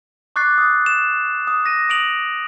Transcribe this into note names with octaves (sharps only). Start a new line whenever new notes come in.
C#6 D6 F#6 A6 C7
D#6 A6
E7
D#6
A#6 D#7
D#6 D7 F7 F#7